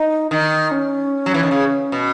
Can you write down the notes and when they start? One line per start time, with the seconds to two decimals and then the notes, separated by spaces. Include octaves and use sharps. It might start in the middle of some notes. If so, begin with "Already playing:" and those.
Already playing: D#4
0.31 D#3 D#4
0.71 C#4
1.26 F#3
1.34 E3
1.43 D#3
1.51 C#3
1.92 B2